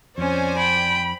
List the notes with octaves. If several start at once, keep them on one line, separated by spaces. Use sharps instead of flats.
F2 C#4 C5 D5 G#5
G5 B5